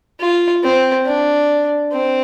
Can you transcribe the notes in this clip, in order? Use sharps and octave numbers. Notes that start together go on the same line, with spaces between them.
F4
C4
D4
C4